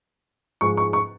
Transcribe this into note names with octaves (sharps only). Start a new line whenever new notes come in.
G#2 F3 G#3 C#6
C#6
C#6